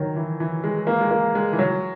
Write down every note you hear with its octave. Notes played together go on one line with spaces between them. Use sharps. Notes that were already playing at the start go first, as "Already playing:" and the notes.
Already playing: D#3 F#3
E3
E3
G#3
A#3
G#3
A#3
G#3
E3
F#3